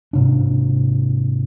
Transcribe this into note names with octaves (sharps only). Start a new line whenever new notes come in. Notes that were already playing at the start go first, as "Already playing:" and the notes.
G#2 C3 D4